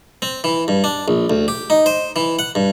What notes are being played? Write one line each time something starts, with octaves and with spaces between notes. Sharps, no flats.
C4
E3
G2
D4
A#1
D2
G4
D#4
C5
E3
F#5
G2